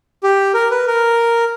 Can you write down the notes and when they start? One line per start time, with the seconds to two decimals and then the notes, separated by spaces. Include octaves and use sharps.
0.23 G4
0.54 A#4
0.71 B4
0.87 A#4